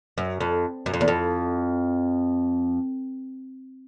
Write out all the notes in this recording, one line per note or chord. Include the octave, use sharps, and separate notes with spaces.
F#2
F2
F#2
F2
E2
F2